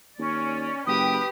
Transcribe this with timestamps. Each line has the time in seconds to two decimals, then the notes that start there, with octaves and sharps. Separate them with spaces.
0.18 D#2 C#4 D5
0.86 F#1 G4 B4 G5 D#6